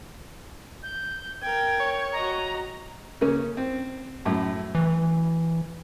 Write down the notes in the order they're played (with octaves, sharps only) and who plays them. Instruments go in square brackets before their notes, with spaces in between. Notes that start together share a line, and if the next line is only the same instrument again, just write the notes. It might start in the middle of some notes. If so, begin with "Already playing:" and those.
[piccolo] G6
[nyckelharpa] A#4 G5 [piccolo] G#6
[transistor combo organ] C#5
[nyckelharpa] F#4 D#5 [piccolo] A#5
[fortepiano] C#3 A#3 C#4
C4
F#2 A2
[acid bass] E3